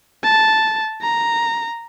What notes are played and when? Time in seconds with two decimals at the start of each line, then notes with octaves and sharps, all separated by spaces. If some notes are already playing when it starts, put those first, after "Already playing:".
0.24 A5
1.02 A#5